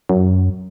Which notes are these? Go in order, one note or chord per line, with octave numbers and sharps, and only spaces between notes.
F#2